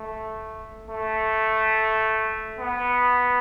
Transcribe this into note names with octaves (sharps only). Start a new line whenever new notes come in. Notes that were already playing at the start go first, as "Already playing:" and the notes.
Already playing: A3
A3
B3